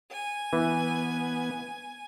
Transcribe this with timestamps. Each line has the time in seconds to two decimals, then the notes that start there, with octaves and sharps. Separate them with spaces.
0.11 G#5
0.53 E3 B3